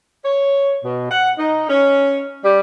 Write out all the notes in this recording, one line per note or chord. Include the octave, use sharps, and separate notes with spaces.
C#5
B2
F#5
D#4
C#4
G3